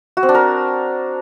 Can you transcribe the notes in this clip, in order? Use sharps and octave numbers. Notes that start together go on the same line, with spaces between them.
F#4
C4
D4
A#4